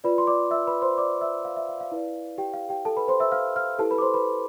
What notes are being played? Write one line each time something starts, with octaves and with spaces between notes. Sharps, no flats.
F4 B4 D5 B5
C6
D5 D6
E5 E6
B4 B5
C5 C6
D5 D6
E5 E6
F5
E5
F5
F5
E4 B4 D5
G4 G5
F5
G4 G5
A4 A5
B4 B5
C5 C6
E5 E6
F5 F6
F5 F6
E4 G4 A4 B4 A5
B4 B5
D6
C5 C6
B4 B5